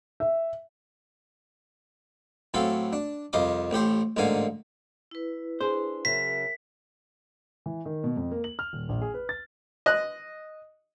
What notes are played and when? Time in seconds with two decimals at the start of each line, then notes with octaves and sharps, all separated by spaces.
0.20 E5
2.54 A2 F#3 C4 A4 F5
2.93 D4
3.33 C2 F2 D#5 F5 D6
3.71 A1 A2 G4 C5
4.17 A1 G#2 D3 A#3 F5 G#5
5.11 E4 B4
5.61 D4 G#4 C5
6.05 C#3 F#3 A#4 E5 B6
7.66 E3
7.85 D#3
8.04 B2
8.17 F2
8.31 A#3
8.44 F#7
8.59 F6
8.73 D#1
8.89 A#1
9.01 G#4
9.14 B4
9.29 A6
9.86 D#5 F#6